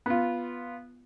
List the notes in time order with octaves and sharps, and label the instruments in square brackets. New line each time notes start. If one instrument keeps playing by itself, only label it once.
[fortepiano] B3 F4